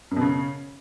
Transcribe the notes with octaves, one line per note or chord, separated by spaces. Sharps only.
F#2
B2
C#3